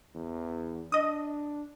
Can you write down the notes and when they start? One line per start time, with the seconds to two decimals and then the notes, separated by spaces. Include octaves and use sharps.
0.15 E2
0.92 D4 D#5 D#6